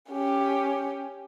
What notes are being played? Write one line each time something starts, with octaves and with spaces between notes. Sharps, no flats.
C#4 G4